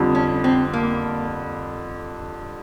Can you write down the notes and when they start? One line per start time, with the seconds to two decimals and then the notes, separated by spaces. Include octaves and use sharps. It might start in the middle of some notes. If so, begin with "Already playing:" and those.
Already playing: F2 D3 G3
0.15 C#4
0.44 C4
0.74 A#3